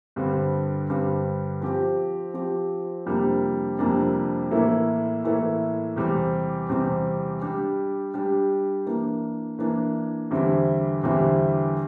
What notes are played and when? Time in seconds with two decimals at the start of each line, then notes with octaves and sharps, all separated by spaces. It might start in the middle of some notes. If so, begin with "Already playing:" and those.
0.16 G2 D3 G3 C4
0.89 G2 D3 G3 C4
1.61 F3 C4 G4
2.34 F3 C4 G4
3.06 F2 C3 G3 A#3 D4
3.79 F2 C3 G3 A#3 D4
4.51 A2 E3 A#3 E4 A4
5.24 A2 E3 A#3 E4 A4
5.96 E2 C3 G3 C4 G4
6.69 E2 C3 G3 C4 G4
7.41 G3 D4 G4
8.14 G3 D4 G4
8.86 E3 A#3 D4
9.59 E3 A#3 D4
10.31 E2 D3 G3 C4 E4
11.04 E2 D3 G3 C4 E4